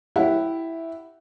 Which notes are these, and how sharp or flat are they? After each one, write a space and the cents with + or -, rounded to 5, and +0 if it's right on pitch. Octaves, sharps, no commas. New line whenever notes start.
E4 +0 G4 -15 F#5 +0